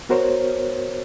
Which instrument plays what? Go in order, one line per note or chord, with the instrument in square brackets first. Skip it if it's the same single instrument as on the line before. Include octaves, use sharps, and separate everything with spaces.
[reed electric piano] B3 F#4 A#4 C5 C#5